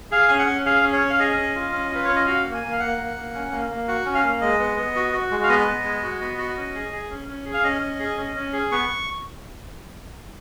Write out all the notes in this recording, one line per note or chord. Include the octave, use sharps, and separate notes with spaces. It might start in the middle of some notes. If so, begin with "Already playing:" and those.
G#4 F5
C#4 G#5
F#5
C#4
G#4 F5
C#4
C#5
C#4
F5
G#4 D#5
C#4
F4
C#4
F4 B4
C#4 C#5
D#5
F#4 F5
A#3
G#5
A#3
F5
A#3 F#5
A#3
A#3
C#4
A#3
A#3
F#4 F#5
C#4
F5
A#3
G#3 D#5
B3
B3
F#4
F#4
G#3
F5
B3 D#5
B3
G#3
F#4
B3
F#4
C#4
G#4
G#4
C#4
C#4
G#4
F5
C#4 D#5
C#4
G#4
C#4
C#4
G#4
B3 C#6